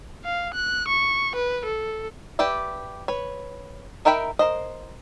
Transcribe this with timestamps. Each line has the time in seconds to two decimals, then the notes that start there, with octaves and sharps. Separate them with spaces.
0.24 F5
0.54 F#6
0.88 C#6
1.35 B4
1.65 A4
2.39 G4 B4 D5 E5
3.08 B4 C#5
4.05 D#4 A#4 E5 G5 B5
4.39 A#4 C5 D#5